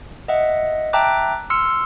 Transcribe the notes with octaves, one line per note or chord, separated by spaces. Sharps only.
D#5 E5 F#5
E5 G5 A5 A#5 D6 F#6
C6 E6 F6 C#7